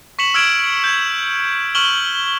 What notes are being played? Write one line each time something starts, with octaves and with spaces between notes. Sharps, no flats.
C#6 B6 C#7 E7 F#7
E6 F6 G#6 D7 E7
G6 G#6
C#6 F6 E7 F#7 G7